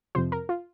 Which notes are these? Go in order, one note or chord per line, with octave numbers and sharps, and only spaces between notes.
F2 C3 F3 C5
A#4
F4